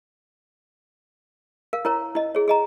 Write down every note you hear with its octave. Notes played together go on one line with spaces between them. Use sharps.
A#4 F5
E4 A#4 C#5 A#5
E4 D#5
G#4 C#5
G#4 D#5 A#5